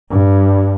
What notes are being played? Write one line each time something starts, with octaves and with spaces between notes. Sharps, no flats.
G2